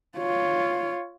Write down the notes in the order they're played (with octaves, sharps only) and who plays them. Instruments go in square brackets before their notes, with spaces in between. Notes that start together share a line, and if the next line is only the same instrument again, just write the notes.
[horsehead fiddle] F4 C#5